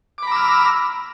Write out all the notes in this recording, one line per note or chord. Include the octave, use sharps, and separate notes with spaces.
A#5 B5 D6 E6 F6